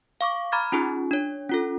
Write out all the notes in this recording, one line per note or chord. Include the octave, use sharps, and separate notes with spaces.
F5 C#6 D6
A#5 B5 D6 F6 G#6 A6
C#4 D#4 F4 G#4
D4 C#5
C#4 F4 A4